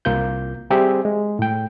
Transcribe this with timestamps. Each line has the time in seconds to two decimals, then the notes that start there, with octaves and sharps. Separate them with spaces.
0.05 C2 A#3 F4 G6
0.70 G3 C4 G4 G#4 E5
1.05 G#3
1.39 A2 G5